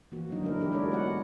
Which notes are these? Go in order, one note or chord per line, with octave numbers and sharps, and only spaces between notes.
E3 A#3 F#4
D3 F#3 D4 D#4
A3 D4 E4 A#4
E3 D4 E4 G4 A#4
G#3 D4 F#4 A#4 C#5 D5
B3 F4 F#4 F#5